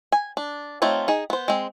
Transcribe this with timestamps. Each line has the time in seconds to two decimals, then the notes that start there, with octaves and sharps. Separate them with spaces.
0.12 G#5
0.37 D4
0.82 A3 C4 D#4 F4 C#5
1.08 D#4 G#4
1.30 B3 C5
1.48 G#3 C4